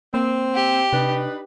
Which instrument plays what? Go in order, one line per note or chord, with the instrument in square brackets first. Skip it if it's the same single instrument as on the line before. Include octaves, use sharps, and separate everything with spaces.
[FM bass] A#3 [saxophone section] C4
[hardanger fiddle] G4
[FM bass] C3 [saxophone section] D4 D#4 B4